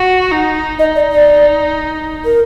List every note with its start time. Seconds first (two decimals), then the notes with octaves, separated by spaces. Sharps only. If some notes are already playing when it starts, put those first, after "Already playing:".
Already playing: F#4
0.31 D#4
0.79 D#4 D#5
0.95 D5
1.12 D5
2.25 A#4